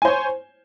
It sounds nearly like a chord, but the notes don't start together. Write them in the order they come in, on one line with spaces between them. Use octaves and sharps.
G#5 C5 C#5